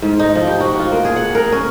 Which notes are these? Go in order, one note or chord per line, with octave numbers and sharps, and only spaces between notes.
G#2
D#4
F3
G4
F#4
F4
A#3
G#4
F#5
A#4
C#4